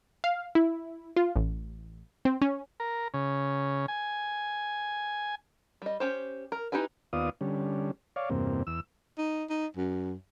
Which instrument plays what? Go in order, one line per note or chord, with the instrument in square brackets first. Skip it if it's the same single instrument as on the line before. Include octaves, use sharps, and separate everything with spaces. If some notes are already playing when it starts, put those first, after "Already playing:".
[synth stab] F5
E4
F4
A1
C4
C#4
[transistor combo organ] A#4
C#3
G#5
[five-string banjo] G3 D#5
C#4 G4 C5
A#4
D#4 E4 G4 B4 G#5
[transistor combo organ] D#2 B3 F4 D5 F5 D#6
D3 G3 C#4
C#5 D5 F5
E2 G2 C3 A#3 C4
E2 E6
[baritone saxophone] D#4
D#4
F#2